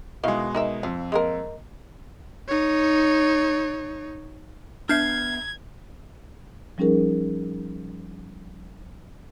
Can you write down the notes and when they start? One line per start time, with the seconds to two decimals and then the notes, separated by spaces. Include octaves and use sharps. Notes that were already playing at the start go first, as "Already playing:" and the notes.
0.24 B2 D#3 G#3 E4 F5
0.55 D#4 A#4 E5
0.83 F2 F4
1.12 G#3 A#3 A#4
2.48 D#4 C#5
4.89 B3 D4 B4 E5 F6 G6 G#6 C7
6.78 F3 G3 C#4 D#4 G#4 A#4